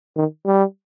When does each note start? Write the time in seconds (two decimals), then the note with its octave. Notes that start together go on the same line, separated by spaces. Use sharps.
0.16 D#3
0.46 G3